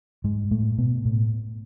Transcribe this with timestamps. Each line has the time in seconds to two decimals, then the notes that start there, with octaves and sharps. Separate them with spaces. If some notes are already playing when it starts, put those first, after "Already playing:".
0.24 G#2 G#3
0.51 A2 A3
0.78 B2 B3
1.05 A2 A3